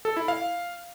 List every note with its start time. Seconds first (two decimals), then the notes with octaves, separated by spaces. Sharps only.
0.05 A4
0.17 E4
0.28 F5